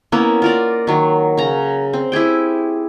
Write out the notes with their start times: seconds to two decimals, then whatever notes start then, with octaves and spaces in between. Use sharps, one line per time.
0.12 A#3 B3 C#4 E4
0.42 F4 A#4 D5
0.87 D#3 F#3
1.37 C#3 A#5
1.93 C4
2.12 E4 G4 G#4 G5